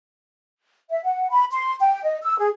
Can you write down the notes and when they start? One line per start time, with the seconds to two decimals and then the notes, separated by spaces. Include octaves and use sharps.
0.90 E5
1.04 F#5
1.31 B5
1.52 C6
1.81 G5
2.04 D#5
2.22 E6
2.39 G#4